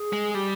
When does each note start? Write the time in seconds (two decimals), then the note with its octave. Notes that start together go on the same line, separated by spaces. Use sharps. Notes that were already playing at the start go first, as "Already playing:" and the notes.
Already playing: G#4
0.13 G#3
0.35 G3 G4